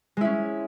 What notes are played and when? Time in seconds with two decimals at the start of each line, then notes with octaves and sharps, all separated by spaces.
0.17 G#3
0.21 E4
0.25 C#4